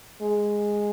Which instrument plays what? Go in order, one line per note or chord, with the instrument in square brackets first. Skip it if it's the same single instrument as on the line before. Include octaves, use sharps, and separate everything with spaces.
[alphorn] G#3